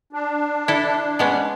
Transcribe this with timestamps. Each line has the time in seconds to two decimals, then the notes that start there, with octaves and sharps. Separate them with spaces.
0.13 D4
0.68 E4 A4
1.19 G#3 B3 C#4